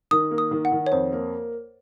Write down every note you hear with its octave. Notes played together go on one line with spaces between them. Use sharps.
D#3 D#6
A#3
D#6
D#3
F#5
D#3
C#5
F2 C5
A#3